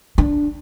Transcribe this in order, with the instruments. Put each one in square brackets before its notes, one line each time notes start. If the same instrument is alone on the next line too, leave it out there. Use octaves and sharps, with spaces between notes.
[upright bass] D4